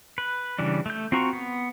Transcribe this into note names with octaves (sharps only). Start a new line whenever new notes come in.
B4
C#3 E3 G3 D4
A3 G6
C4 F4 F#4 A#5 C#6
B3